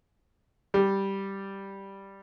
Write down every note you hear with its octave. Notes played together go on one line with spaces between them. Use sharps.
G3